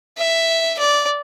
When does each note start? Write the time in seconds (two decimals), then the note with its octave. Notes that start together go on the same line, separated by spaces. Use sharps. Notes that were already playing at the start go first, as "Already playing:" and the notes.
0.18 E5
0.79 D5